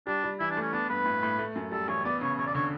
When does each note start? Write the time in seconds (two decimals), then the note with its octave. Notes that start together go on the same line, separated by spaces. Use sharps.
0.07 G3 D4
0.24 G3
0.40 E3 E4
0.51 D4
0.57 A3 C#4
0.73 B3 D4
0.89 G2 B4
1.06 A2
1.23 A2
1.39 A3
1.56 F#2
1.72 G3 A4
1.88 A1 C#5
2.05 B3 D5
2.21 C#3 C#5
2.38 E1 C#5
2.46 D5
2.55 D3 C#5